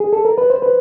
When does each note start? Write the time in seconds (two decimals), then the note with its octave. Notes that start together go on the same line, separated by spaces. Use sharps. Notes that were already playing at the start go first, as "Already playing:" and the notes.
0.00 G#4
0.13 A4
0.25 A#4
0.38 B4
0.50 C5
0.62 B4